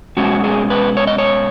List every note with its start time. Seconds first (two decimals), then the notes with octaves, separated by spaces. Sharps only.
0.17 B2 G#3 C#4 F#4
0.44 G#4
0.70 B4
0.97 C#5
1.07 D#5
1.18 C#5